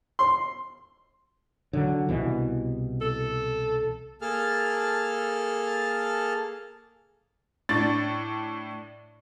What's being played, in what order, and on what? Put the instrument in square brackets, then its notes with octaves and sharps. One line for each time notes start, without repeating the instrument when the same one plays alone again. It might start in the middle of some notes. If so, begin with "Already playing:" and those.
[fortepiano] C6
[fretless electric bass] D3 F#3
C2 B2 E3
[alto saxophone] A4
[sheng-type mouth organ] A#3 G#4 A4 A5 F6
[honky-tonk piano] A2 D4 A6